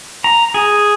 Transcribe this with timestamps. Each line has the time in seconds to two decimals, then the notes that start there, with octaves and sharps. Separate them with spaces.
0.24 A#5
0.54 G#4